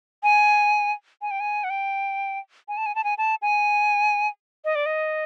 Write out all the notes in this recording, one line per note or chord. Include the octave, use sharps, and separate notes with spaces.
G#5
G#5
G5
G#5
F#5
G5
G#5
A5
G#5
A5
G#5
A5
G#5
D#5
D5
D#5